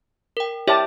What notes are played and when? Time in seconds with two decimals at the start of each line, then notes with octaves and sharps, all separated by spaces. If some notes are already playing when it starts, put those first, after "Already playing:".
0.37 A#4 G5
0.67 E4 G4 C#5 D5 E5 A5